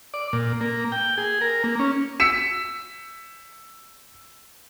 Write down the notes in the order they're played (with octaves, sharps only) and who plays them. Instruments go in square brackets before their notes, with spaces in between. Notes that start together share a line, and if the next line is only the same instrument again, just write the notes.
[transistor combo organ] D5
A#2
A#3
G5
G#4
A#4
A#3
C#4
[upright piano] E6 B6 C#7 E7